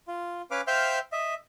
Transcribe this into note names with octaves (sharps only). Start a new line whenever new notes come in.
F4
C#4 B4 F5 D6
C5 E5 F5 G5 F6 G6
D#5 E5